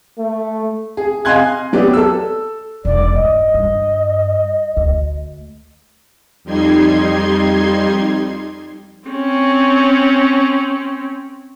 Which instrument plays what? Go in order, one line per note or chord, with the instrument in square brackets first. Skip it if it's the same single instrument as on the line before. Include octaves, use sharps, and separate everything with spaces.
[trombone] A3
[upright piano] G#4
D#5 F5 G#5 C6 F#6 G#6
F#3 B3 G4 D5
A4 E6
[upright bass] E1 D#4 [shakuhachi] D5
[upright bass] G2 [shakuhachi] D#5
[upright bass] G2
D2
[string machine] F2 G3 D#4 C6 G#6
[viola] C4 C#4